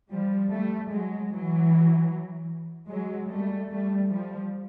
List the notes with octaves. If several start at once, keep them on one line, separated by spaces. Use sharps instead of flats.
F3 G3
G3 A3
F#3 G#3
E3 F#3
F#3 G#3
G3 A3
G3 A3
F3 G3